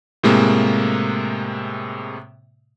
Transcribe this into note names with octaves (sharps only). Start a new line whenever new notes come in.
A2 C3 G#3 A#3